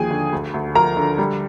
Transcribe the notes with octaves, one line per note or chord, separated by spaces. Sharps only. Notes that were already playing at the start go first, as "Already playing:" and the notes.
Already playing: D#2 D3 F3 G#4 G5 G#5
D3
D2
D2
F3 A#4 A#5
D3
G3